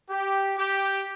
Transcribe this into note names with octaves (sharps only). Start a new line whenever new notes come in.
G4
G4